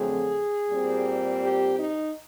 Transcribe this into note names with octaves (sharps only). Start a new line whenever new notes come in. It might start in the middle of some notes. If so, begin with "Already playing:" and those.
Already playing: F2 D3 F#3 A3 C4 G#4
A#2 G3 C4
G4
D#4